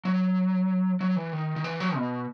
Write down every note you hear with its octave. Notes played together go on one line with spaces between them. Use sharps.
F#3
F#3
E3
D#3
D#3
E3
F#3
B2